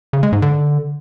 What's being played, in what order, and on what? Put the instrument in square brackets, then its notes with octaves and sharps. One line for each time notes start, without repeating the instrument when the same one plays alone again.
[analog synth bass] C#3
G#3
G#2
D3